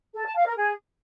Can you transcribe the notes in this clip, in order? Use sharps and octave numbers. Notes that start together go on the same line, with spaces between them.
A4
A5
F5
A#4
G#4